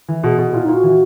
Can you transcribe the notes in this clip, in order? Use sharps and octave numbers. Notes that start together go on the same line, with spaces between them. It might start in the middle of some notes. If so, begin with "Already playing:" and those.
E3
B2 G#4
B2
A#2 E4
D#4
A#2
F#4
E3